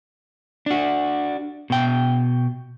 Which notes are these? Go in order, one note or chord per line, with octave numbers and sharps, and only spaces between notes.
D4 F#4
B2 G5